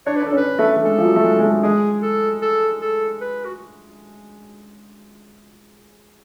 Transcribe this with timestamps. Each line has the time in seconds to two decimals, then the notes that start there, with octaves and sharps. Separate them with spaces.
0.06 D4 C#5
0.16 B4
0.22 D4 A4
0.32 C#4 B4
0.59 A3
0.76 A3
0.84 G#3 A4
0.98 F3
1.05 F#3
1.16 A3
1.24 G#3
1.39 G#3
1.44 A3
1.63 G#3 G#4
2.02 A4
2.42 A4
2.81 A4
3.21 B4
3.45 F#4